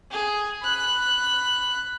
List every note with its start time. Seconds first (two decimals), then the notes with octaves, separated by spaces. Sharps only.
0.11 G#4
0.63 B5 F#6